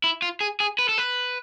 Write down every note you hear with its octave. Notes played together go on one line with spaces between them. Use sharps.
E4
F4
G#4
G#4
B4
A4
B4